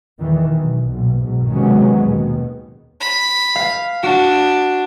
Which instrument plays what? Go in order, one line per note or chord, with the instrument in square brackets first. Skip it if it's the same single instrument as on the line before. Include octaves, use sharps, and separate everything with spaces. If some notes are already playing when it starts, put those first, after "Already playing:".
[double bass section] E2 D#3 E3
B1
B1 A#2
B1 G#2 B2
C3 D#3 F#3 G#3 B3 C#4
D#2 B2 D#3
[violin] B5
[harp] F5
[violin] D4 [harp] F#4